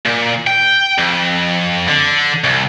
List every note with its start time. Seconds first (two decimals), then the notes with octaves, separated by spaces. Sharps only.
0.06 A#2
0.47 G5
0.99 F2
1.88 D3
2.44 C2